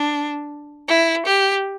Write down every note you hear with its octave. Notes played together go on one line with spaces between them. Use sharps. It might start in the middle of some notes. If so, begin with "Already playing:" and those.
Already playing: D4
E4
G4